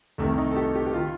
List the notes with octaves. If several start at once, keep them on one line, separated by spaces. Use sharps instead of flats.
C2 C3 D#3 A3
D#4
A4
G4
G4
G4
D#3 F4